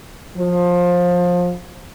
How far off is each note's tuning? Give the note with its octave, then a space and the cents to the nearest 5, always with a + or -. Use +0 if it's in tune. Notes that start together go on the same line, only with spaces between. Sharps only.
F3 +20